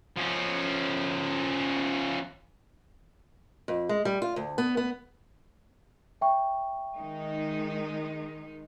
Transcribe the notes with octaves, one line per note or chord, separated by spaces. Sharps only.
F3 C#4
F2
G#3
G3
F4
D2
B3
B3
E5 G5 C#6
D#3 G#3 D#4